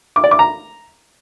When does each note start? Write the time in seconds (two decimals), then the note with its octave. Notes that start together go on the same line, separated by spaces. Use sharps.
0.16 D6
0.24 D5
0.31 D6
0.39 A#5